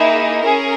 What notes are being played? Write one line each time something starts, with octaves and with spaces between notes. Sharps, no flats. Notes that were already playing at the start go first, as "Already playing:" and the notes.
Already playing: A#3 D#4 E4 G#4 E5
C#4 G#4 A#4